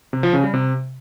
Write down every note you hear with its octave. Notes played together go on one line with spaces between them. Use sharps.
C3
F3
C#3
G3
C3